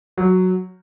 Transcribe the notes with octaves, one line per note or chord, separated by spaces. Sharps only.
F#3